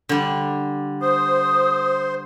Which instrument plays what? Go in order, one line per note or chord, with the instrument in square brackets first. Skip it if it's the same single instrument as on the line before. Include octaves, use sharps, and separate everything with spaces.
[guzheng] D3 G3
[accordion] C5 [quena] D#6